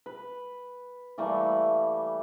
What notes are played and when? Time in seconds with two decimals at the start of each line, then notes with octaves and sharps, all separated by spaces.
0.06 B4
1.18 E3 G3 A3 A#3